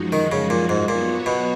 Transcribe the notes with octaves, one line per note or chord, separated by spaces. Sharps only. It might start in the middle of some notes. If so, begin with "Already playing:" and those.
Already playing: F#2 F3 G#3 D#4 F#4
D#3
C#3
A#2
G#2
A#2 F#3 B3 F#4 C#5
B2